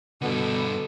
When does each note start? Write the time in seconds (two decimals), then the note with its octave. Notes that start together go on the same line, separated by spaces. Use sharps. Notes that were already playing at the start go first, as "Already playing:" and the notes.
0.22 G2 B2 D3 B3 A4